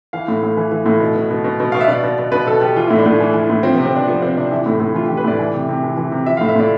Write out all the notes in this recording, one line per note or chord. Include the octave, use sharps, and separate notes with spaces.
E3 F5
A2
A2
E3
E3
A2
B2
B2
B2
B2
B2
B2 F5
E5
B2 D5
B2
B2
B2 B4
B2 A4
B2 G4
E3 F4
A2 E4
D4
A2
E3
E3
A2
F3 C4
C3 B3
C4
C3 D4
F3 B3
F3 C4
C3 D4
E3 E4
A2
A2
E3 F4
E3 G4
B4
A2 D5
E3
C3
C3
E3
E3
C3
F3 E5
A2 F5
E5
A2 D5